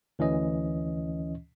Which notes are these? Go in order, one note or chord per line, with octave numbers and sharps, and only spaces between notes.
D2 E3 C#4 D#5